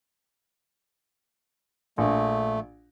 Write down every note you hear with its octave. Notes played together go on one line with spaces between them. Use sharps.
A#1 A3